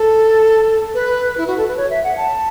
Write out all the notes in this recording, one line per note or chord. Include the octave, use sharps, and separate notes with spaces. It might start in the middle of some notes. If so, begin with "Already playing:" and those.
Already playing: A4
B4
E4
F#4
A4
B4
C#5
E5
F#5
A5